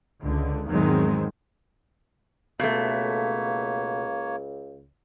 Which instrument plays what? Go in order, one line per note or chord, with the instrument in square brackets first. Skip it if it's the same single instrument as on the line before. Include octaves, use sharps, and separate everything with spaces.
[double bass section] C#2 D3
E2 G#2 D#3 F#3 G#3 C4
[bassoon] C#2 [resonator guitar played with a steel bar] B2 A3 [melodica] A#3 C#5